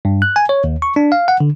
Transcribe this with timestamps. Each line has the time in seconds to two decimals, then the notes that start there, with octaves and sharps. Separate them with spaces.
0.05 G2
0.22 F#6
0.36 G#5
0.49 C#5
0.64 D#2
0.82 C#6
0.96 D4
1.12 F5
1.28 F#5
1.40 D3